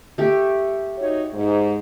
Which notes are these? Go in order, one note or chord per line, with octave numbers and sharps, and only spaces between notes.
A3 G4
D#4 F#4 C#5
G#2